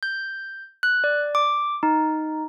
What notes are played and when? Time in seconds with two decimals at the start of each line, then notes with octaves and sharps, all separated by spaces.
0.03 G6
0.83 F#6
1.04 D5
1.35 D6
1.83 D#4